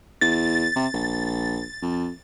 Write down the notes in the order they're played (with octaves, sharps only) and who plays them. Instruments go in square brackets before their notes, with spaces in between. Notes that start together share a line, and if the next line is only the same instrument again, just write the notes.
[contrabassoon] E2 [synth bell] A6
[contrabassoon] C3
A#1
F2